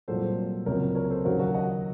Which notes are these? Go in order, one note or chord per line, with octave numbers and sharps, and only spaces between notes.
C2 A#2 F#3 A4 C5
C#2 C3 F#3 A#4 C#5
A#4 C#5
A4 C5
D#2 C#3 F#3 F#4 A#4
F#4 A#4
D#5 F#5